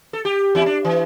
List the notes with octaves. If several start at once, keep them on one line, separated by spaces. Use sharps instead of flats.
A4
G4
E2 E4
D4
E3